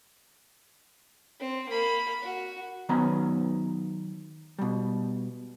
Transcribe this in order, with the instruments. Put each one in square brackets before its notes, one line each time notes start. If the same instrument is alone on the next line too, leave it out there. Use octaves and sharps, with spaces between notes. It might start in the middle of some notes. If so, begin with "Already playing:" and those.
[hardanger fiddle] C4
A#3 B5
F#4
[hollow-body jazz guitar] D#3 F#3 B3 G#5 A#5 B5
B2 G3